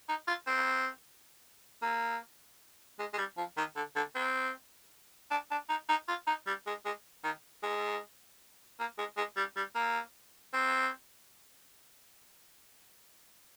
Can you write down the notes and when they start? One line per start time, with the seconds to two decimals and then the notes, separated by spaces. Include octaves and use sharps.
0.09 D#4
0.28 F4
0.47 C4
1.82 A#3
2.99 G#3
3.13 G#3
3.18 G3
3.37 F3
3.57 D#3
3.76 D3
3.96 D3
4.15 C4
5.31 D4
5.51 D4
5.69 D#4
5.89 D#4
6.08 F4
6.27 D#4
6.47 G3
6.67 G#3
6.85 G#3
7.24 D#3
7.63 G#3
8.79 A#3
8.98 G#3
9.17 G#3
9.37 G3
9.56 G3
9.75 A#3
10.53 C4